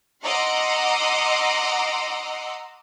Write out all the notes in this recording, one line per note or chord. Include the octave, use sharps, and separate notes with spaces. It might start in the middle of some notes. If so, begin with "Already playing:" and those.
D#5 F#5 A#5 C6 D6 E6